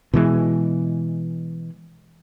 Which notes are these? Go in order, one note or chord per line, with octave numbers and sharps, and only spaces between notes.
B2 E3 G#3